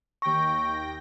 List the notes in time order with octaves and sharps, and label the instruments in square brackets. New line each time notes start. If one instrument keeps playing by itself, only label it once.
[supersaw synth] D#2 G5 A#6 [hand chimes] C#6